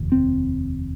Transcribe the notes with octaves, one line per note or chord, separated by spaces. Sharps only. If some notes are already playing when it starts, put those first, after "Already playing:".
Already playing: F1 D#2
C4